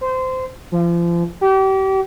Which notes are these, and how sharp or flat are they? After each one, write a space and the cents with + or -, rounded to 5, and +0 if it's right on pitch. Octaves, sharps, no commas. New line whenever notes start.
C5 -20
F3 -35
G4 -35